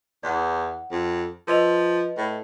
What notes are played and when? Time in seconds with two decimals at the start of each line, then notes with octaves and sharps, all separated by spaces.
0.23 E2 D5 F#5
0.91 F2
1.47 F3 B4 D#5 F7
2.17 A2